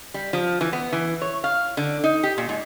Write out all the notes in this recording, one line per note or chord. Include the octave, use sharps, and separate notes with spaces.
G3
F3
E3
B3
E3
C#5
F5
D3
D#4
G4
A#2
G#2